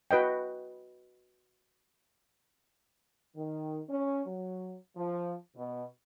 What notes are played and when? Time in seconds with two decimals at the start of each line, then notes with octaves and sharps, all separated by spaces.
0.11 F#4 B4 D#5 G5
3.37 D#3
3.90 C#4
4.27 F#3
4.97 F3
5.56 B2